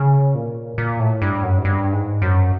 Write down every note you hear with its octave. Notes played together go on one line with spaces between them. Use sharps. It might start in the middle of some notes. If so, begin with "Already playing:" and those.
Already playing: C#3
A#2
A#2
A2
G2
F#2
G#2
G2
G#2
F#2